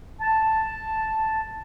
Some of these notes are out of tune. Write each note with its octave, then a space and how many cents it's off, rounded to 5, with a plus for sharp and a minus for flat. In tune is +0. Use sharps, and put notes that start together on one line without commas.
A5 +0